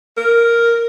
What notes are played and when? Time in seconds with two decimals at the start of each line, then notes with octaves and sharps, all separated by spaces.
0.17 A#4